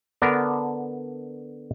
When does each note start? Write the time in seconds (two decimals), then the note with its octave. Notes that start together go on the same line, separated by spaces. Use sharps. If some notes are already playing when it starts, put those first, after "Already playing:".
0.22 D3 B3 D4 A#4